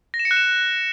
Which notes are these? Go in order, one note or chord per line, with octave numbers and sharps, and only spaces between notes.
A#6
E7
C#7
F#6
E7